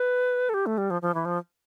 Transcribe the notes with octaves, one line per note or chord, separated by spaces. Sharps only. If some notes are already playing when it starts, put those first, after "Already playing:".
Already playing: B4
A4
G4
A3
G3
F3
F3
E3
F3